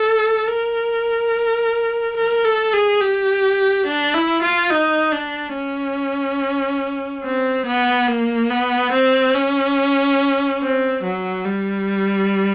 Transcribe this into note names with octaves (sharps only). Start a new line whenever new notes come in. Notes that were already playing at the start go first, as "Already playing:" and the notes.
Already playing: A4
A#4
A#4
A4
G#4
G4
D4
E4
F4
D#4
D4
C#4
C4
B3
A#3
B3
C4
C#4
C4
F#3
G3